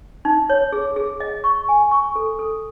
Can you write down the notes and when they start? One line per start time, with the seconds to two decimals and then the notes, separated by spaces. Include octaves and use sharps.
0.25 D#4
0.50 C#5
0.72 G#4
0.96 G#4
1.20 D#5
1.44 C#6
1.69 G#5
1.91 C#6
2.15 A4
2.39 A4